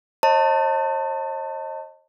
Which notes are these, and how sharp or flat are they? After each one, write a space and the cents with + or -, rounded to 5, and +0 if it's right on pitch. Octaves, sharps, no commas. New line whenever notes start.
C5 +45 D#5 +0 A5 +30